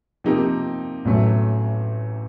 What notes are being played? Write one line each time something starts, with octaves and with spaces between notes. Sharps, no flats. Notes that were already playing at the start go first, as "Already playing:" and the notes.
C3 F3 A#3 D#4 G4
A1 A2 F#3 A3